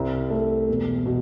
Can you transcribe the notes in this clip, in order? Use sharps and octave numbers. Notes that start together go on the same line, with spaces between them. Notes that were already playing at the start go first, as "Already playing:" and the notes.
Already playing: C2 C4
A3
E1
B2